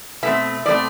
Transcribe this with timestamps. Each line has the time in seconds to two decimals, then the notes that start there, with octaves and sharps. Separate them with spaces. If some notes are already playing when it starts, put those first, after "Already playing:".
0.22 B2 A3 C4 E5
0.66 B2 A3 C4 D5